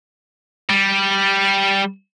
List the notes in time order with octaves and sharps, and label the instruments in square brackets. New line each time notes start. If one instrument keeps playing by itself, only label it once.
[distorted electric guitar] G3